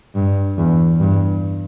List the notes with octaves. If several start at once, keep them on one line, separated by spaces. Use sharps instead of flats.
G2
E2
G2